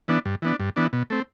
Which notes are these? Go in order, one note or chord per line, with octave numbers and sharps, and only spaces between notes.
E3 B3 D4
G2
E3 B3 D4
G2
E3 B3 D4
B2
A3 C4